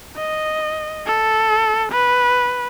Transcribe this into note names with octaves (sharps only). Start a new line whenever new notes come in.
D#5
A4
B4